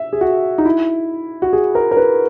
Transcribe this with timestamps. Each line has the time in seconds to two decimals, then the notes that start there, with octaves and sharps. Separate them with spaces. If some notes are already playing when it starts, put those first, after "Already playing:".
Already playing: E5
0.13 G#4
0.21 F#4
0.58 D#4
0.65 E4
1.42 F#4
1.53 G#4
1.75 A#4
1.91 A#4
1.97 B4